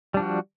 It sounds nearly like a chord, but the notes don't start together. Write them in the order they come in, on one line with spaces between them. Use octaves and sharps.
G3 D4 F3 F#4